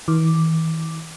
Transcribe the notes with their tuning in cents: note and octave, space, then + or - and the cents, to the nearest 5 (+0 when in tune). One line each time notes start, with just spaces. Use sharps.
E3 -40 D6 +0